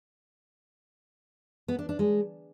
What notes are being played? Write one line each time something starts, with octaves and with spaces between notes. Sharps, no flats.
B3
D4
D4
G#3